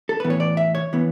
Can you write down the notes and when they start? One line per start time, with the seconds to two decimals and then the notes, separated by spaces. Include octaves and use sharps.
0.09 A4
0.20 A2 E3 B3 B4
0.30 C#5
0.40 D5
0.57 E5
0.75 C#5
0.93 E3 B3